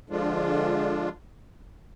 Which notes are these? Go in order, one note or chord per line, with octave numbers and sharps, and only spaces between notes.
D3 F3 G#3 D4 F4